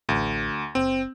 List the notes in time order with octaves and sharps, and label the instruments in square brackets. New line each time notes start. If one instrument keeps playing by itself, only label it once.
[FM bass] A1 [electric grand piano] D2
[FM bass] F#1 [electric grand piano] C4